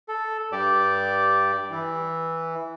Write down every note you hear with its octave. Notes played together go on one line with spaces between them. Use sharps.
A4
G2 G4 D5
E3